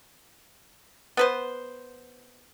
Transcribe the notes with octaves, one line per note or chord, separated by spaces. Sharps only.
B3 B4 C5